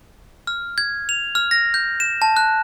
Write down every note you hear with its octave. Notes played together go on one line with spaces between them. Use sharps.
F6
G#6
F7
F6
A#6
G6
E7
A5
F#6